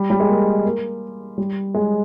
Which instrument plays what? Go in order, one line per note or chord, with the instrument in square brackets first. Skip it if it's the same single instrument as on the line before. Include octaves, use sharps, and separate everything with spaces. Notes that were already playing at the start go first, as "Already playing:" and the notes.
Already playing: [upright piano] G3
G3
G#3
A#3
A#3
G3
G#3